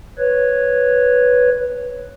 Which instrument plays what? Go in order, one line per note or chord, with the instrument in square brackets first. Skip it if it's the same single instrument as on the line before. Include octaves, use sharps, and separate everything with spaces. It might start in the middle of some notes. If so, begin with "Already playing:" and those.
[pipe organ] B4 C#5